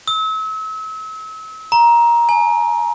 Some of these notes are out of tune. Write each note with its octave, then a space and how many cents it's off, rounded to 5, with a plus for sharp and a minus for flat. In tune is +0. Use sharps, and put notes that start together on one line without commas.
E6 -40
A#5 +15
G#5 +40